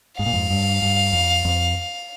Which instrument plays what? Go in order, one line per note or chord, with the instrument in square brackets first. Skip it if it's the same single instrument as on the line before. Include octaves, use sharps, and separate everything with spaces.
[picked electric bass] G#2 [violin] F5
[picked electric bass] A#2
F2 G#2
G2
G2
F2
F2